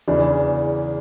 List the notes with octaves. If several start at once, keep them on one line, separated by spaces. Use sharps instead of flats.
E2 C#3 E3 D4